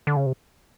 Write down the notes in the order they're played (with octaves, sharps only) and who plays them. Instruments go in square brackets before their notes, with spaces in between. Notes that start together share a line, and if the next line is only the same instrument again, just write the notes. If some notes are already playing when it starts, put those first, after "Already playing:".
[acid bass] D3
C#3
C3